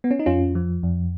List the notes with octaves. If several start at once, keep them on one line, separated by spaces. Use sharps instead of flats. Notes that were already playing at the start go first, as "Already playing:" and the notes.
B3
C#4
D#4
F2 C#4 F4
F3
F2